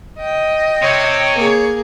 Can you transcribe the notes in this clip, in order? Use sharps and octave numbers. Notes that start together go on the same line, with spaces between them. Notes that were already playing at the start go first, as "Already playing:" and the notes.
D#5 G5
C3 C#5
A#3 G#4